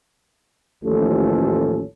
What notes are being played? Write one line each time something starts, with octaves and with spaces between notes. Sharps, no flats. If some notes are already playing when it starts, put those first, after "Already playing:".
A1 D#2 A2 F3 C#4 A4